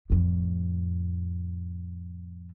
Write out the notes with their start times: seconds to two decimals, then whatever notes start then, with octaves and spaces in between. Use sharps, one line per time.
0.10 F2 A2